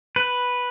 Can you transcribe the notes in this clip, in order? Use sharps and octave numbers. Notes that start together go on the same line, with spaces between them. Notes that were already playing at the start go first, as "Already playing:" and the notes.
B4